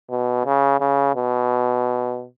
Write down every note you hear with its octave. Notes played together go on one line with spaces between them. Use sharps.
B2
C#3
C#3
B2